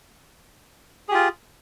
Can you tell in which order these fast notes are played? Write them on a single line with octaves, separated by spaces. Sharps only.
G#4 G4 F4